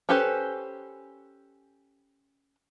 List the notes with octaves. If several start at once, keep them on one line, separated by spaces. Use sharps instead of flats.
C#4 G4 A4 B4 C5